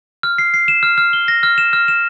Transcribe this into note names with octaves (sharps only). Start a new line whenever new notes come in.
F6
C7
C7
E7
F6
F6
G7
A#6
F6
E7
F6
E7